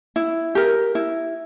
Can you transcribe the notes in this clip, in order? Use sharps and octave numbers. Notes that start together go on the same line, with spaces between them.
E4
G4 A#4
E4